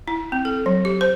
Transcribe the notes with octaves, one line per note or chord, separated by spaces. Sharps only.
E4
C4
A4
F#3
G4
C5